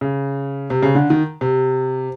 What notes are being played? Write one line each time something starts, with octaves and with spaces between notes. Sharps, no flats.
C#3
C3
C#3
D3
D#3
C3